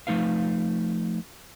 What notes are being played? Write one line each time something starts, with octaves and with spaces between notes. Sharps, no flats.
F3 A3 D#4 B4 F5